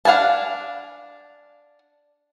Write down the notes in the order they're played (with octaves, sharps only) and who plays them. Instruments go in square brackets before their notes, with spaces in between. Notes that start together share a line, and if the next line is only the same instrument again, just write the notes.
[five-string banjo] D4 F5 F#5 G#5 A5